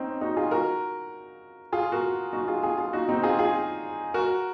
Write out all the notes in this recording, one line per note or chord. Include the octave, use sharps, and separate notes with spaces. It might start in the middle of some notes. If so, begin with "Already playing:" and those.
Already playing: C4 C#4 D#4
D#4 F#4
F4 G#4
F#4 A#4
F4 G#4
F#4 A#4
D#4 F#4
F4 G#4
F4 G#4
F4 G#4
D#4 F#4
C4 D#4
F4 G#4
F4 G#4
F#4 A#4